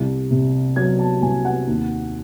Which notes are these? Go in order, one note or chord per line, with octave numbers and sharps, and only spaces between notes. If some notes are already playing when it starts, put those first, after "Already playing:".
Already playing: C2
C3
F#3 G#6
A5
C2 G#5
F#5
D#2